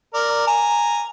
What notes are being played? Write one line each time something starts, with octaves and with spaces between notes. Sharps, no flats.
A#4 D5
G#5 A#5